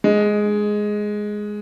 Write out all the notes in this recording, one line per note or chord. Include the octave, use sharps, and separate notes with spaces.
G#3